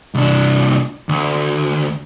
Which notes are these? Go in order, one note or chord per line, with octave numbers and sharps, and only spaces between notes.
C2 D4
D2